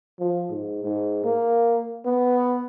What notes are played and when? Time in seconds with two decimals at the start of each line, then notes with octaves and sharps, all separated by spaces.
0.19 F3
0.49 G#2
0.84 G#2
1.24 A#3
2.05 B3